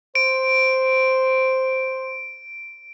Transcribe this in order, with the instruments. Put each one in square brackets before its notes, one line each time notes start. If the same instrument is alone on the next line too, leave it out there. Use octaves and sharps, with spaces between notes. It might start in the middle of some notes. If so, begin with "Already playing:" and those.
[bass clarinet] C5 [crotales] D7